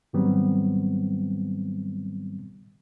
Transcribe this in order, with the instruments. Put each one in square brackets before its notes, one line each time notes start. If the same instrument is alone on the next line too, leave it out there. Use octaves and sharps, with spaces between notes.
[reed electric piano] G#2 D#3 F#3 G3 B3 C4